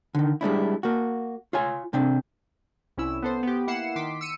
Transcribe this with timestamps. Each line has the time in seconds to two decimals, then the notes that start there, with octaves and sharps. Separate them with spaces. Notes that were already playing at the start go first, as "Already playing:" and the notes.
0.15 D3 D#3
0.41 G3 G#3 D4 E4
0.83 A#3 F#4
1.53 F4 C#5 G#5
1.93 C3 C4 D4
2.98 C2 C#4 E4 E6
3.23 B3 A4 C5
3.43 B3 G4
3.67 A#3 E4 F#5 C7 C#7 E7
3.96 D#3 C6 D6 B6
4.21 E6 C#7 D#7